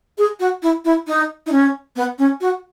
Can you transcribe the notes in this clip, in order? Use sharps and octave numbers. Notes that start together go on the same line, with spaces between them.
G#4
F#4
E4
E4
D#4
D#4
C#4
B3
C#4
F#4